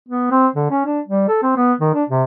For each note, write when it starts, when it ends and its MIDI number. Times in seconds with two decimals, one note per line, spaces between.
0.08 0.28 59
0.31 0.47 60
0.55 0.66 50
0.70 0.81 61
0.85 1.00 62
1.07 1.25 55
1.28 1.41 69
1.42 1.54 60
1.56 1.73 59
1.80 1.90 51
1.94 2.03 62
2.09 2.23 48